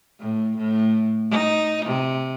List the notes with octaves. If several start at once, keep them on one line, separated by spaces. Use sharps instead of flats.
A2
A2
D#4
C3